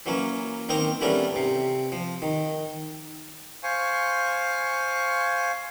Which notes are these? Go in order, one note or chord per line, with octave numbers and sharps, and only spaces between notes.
E3 F#3 A#3 C#4
D#3 A#3 C4 A#4 D#5 A#5
E3 G3 A3 B3 C#4 A#4
C3
F3
D#3
C5 F5 G#5 C#6